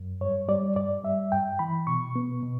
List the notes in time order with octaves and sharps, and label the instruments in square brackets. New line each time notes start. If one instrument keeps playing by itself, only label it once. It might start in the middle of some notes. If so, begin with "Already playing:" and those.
Already playing: [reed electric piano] F#2
G2 C#5
G3 D5
G2 D5
G3 E5
G2 G5
E3 B5
B2 C#6
B3
B2